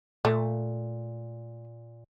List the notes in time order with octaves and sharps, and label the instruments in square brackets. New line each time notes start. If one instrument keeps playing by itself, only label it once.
[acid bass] A#2 [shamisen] A3